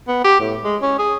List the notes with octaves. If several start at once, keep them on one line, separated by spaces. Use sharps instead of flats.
B3
G4
A2
G#3
C#4
G#4